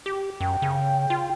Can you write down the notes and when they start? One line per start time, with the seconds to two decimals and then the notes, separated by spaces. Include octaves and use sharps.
0.06 G4
0.41 F#2 G5
0.62 C#3
1.10 F4